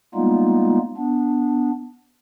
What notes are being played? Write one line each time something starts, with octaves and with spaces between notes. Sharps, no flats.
G3 G#3 A#3 B3 D#4 F4
B3 D4